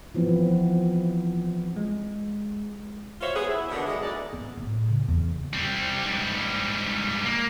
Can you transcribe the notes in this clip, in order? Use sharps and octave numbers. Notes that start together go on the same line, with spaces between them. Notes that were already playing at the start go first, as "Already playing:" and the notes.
E3 F3 B3 C4 E4
G#3
F4 F#4 C5 C#5 E5
B3 G#4
E4
B2 D3 D#3 B3 D4
F#3 G#3 E4 G#4 A4
D2 G#3 D#4 D5
B3
A2
C#3
E2
G3 C4
G#2 G3
A#3